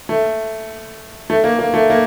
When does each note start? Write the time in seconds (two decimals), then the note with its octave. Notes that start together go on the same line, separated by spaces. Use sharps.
0.09 A3
1.30 A3
1.44 A#3
1.59 A#3
1.74 A3
1.90 A#3